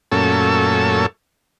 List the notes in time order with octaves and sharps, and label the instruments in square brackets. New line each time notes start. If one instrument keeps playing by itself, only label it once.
[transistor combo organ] F#2 A#2 A3 C#4 A4 E6